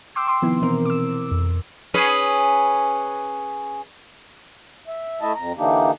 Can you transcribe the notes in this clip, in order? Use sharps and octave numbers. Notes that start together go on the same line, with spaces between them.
G5 C6 D6 E6
C6 D6
C3 D#3 F3 B3 E4
B2 E3 C4 A#4
D6 E6
F2
C#4 G#4 B4
E5
A3 E4 D#5 E5 A5
F2 A#5
D3 E3 A#3 D4 D#4 G4